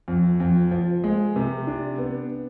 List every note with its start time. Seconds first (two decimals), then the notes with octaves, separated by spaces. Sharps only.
0.08 F2
0.40 F2
0.71 F3
1.04 G#3
1.36 C3
1.67 D4
1.98 B3